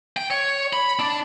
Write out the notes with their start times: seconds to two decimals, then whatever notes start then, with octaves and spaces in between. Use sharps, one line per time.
0.17 G5
0.30 C#5
0.73 B5
0.99 D4